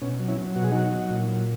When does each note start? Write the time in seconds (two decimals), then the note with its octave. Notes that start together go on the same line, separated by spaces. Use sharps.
0.02 B2 C#4
0.20 F#3
0.28 C#4 E4
0.38 F#3
0.56 B2 F#4
0.64 G#4
0.72 F#3 D#4 F#4
0.92 F#3
1.10 A#2
1.29 F#3